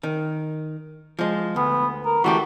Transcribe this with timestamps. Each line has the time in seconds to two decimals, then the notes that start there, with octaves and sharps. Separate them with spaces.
0.03 D#3
1.19 F3 G#3
1.56 D2 B3
2.05 A#4
2.24 E3 A3 F#4 G4